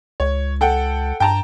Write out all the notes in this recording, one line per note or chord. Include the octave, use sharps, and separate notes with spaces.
C#2 C#5
A4 F#5 G5
G2 G5 A5 A#5